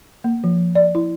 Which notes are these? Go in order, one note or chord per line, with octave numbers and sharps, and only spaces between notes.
A#3
F3
D5
E4